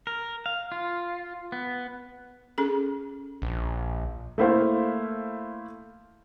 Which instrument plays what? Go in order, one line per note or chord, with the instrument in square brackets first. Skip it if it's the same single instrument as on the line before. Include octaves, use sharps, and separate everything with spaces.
[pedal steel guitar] A#4
F5
F4
B3
[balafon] C#4 G#4 A4
[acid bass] A#1
[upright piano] A3 A#3 E4 C5 F5 C6